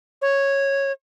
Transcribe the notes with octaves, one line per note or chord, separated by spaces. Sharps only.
C#5